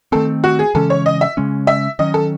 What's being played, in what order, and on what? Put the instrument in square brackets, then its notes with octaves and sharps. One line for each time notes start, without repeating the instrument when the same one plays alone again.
[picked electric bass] D#3 A3 C4 [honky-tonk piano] A4
[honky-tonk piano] F#4
G#4
[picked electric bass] C#3 E3 G#3 C#4 [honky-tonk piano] A4
[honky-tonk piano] C#5
D#5
E5
[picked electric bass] C#3 G#3 C#4
[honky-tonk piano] E5
[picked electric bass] D#3 F#3 C#4 [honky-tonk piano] D#5
[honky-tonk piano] A4